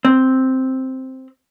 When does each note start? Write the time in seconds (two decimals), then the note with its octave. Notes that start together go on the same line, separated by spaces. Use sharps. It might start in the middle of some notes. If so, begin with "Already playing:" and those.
0.05 C4